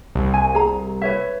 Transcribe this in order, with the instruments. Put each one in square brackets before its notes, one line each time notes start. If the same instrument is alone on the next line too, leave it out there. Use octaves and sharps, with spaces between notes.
[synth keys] C2
[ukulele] G#5
G#4 A#5
B4 C#5 E5